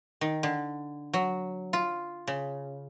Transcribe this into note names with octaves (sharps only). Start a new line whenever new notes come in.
D#3
D3
F#3
F4
C#3